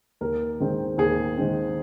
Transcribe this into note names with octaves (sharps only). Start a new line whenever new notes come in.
D#2 A#4
D#3 G#3 C4
D#2 G#4
D#3 G#3 C4